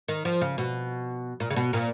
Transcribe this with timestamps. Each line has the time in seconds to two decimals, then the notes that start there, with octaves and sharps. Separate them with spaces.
0.08 D#3
0.25 F3
0.41 C#3
0.58 B2
1.40 A#2
1.50 C#3
1.56 B2
1.73 A#2